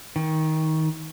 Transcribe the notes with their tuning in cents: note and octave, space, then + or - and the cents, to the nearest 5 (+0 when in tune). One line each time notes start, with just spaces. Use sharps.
D#3 +20